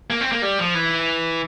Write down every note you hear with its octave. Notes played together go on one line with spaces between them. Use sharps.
A#3
C4
A#3
G3
F3
E3